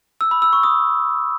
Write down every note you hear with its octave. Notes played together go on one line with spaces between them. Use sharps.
E6
B5
E6
C#6
D#6